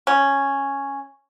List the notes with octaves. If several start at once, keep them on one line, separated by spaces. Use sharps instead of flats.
C#4